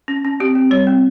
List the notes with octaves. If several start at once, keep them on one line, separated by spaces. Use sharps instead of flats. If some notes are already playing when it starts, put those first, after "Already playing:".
C#4
C#4
C4 G4
C4
G3 C#5
C4